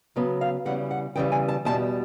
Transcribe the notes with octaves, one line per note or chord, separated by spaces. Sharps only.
C#3 F#3 B3
F5
E2 C#3 E3 G3 F#5
F#5
E2 C#3 E3 G3 G5
G#5
A5
E2 B2 G3 A5